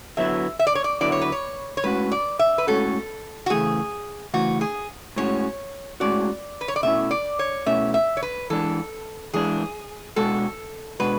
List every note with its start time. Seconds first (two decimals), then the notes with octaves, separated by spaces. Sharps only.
0.17 D3 F#3 B3 E4 E5
0.59 E5
0.67 D5
0.75 C#5
0.84 D5
1.01 D3 F#3 B3 E4 D5
1.12 C#5
1.21 B4
1.32 C#5
1.77 C#5
1.84 A2 G#3 C#4 F#4 B4
2.12 D5
2.39 E5
2.58 B4
2.67 A2 G#3 C#4 F#4 A4
3.46 F#4
3.50 C#3 E3 A3 G#4
4.33 C#3 E3 A3 F#4
4.61 G#4
5.16 A2 G#3 C#4 F#4 C#5
6.00 A2 G#3 C#4 F#4 D5
6.61 B4
6.68 C#5
6.76 D5
6.83 B2 A3 C#4 E4 E5
7.11 D5
7.39 C#5
7.66 B2 A3 C#4 E4 E5
7.94 E5
8.17 C#5
8.22 B4
8.50 E3 G#3 D4 A4
9.34 E3 G#3 D4 G#4
10.16 B2 G#3 D4 F#4 A4
11.00 B2 G#3 D4 F#4 B4